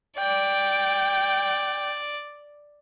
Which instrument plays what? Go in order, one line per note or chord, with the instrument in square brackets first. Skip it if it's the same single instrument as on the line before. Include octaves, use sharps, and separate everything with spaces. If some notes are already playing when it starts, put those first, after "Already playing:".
[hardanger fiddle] D5 [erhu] G5